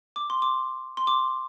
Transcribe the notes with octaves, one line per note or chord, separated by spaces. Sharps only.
D6
C6
D6
C6
D6